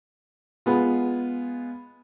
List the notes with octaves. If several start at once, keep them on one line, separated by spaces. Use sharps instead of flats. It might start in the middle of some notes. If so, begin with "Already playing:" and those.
G#3 B3 F4